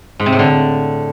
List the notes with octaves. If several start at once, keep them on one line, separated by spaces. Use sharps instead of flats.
G#2
C3
A2
D3